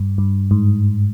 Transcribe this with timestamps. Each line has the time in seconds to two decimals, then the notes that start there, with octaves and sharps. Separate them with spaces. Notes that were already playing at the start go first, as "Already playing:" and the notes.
Already playing: G2
0.18 G2
0.51 G#2